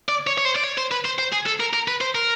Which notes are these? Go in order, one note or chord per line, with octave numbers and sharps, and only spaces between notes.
D5
C#5
C#5
C5
D5
C#5
C5
B4
C5
C5
G#4
A4
A#4
A#4
B4
C5
A#4